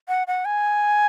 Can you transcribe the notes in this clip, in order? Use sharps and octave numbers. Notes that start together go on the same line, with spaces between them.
F#5
F#5
G#5